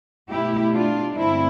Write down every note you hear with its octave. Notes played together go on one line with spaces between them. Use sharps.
B2 A3 E4 G4
D4 F4
G2 D3 A3 C4 E4